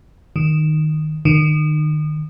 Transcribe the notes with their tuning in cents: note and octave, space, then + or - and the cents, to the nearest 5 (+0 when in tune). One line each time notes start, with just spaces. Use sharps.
D#3 -10
D#3 -35